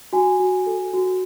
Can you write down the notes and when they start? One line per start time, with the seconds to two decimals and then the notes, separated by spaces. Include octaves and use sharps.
0.13 F#4 G#5
0.40 F#4
0.66 A4
0.93 F#4